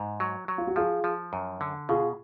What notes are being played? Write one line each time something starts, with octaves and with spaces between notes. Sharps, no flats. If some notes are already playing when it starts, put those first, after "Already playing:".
Already playing: G#2
F#3
F#3
F4
F#4
F3 F4 G#4
F3
F#2
D3
B2 F4 G#4